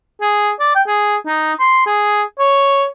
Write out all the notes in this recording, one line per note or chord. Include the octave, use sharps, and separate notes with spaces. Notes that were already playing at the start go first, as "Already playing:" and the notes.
G#4
D5
G5
G#4
D#4
C6
G#4
C#5